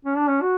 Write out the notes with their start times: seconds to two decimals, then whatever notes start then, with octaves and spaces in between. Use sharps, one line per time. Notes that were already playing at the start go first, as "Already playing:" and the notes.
0.05 C#4
0.17 D4
0.28 C#4
0.41 F#4